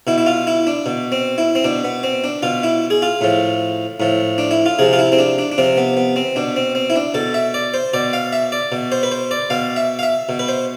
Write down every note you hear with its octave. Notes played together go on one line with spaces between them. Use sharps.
B2 E4
E4
F4
E4
D4
B2
C4
E4
C4
B2 D4
B3
C4
D4
B2 F4
E4
G#4
F4
A2 F3
A2 F3
D4
E4
F4
C3 F3 G#4
F4
E4
C4
D4
D4
D4
C3 F3 C4
B3
B3
C4
B2 D4
C4
C4
E4
D4
B2 A4
E5
D5
C5
B2 D5
F5
E5
D5
B2
C5
B4
C5
D5
B2 F5
E5
F5
E5
B2
B4
C5